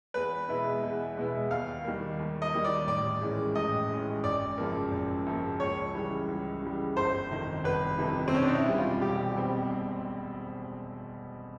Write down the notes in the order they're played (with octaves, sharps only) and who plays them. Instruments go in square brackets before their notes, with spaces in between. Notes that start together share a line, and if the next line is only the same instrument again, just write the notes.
[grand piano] E2 [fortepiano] B4
[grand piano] B2 G#3 B3 E4
E2
B2 G#3 B3 E4
[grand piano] D#2 [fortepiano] F5
[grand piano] D#3 G3 A#3
D#2
[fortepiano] D#5
[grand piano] D#3 G3 A#3
[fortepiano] D5
[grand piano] A1 [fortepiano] D5
[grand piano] G#2 E3 G#3 C#4
[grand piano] A1 [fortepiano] D#5
[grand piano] G#2 E3 G#3 C#4
[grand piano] G#1 [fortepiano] D5
[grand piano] F#2 C#3 F3 A#3
G#1
F#2 C#3 F3 A#3
[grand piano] C#2 [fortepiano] C#5
[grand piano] C#3 E3 G3
C#2
C#3 E3 G3
[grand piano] G1 [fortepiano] C5
[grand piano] F2 C3 D#3
[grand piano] G1 [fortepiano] B4
[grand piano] F2 C3 D#3
[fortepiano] C4
[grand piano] E1 [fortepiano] C#4
[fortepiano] D4
D#4
E4
[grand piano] E2 B2 G3 C4
[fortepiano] F4
[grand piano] E1 [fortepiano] G4
[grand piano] B2 G3 C4